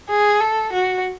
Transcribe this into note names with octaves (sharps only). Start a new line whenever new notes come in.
G#4
A4
F#4